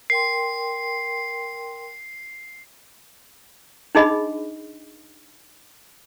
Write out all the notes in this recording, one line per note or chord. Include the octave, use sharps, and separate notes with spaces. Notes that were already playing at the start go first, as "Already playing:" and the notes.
A#4 G5 C6 C7
D4 D#4 G#4 D#5 B5